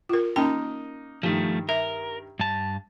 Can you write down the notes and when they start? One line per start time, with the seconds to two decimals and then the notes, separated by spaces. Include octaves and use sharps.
0.09 F4 A#4
0.36 A#3 C#4 D#4 G5 A5
1.23 G2 D#3 F3 A3
1.69 A#4 E5
2.39 G2 A5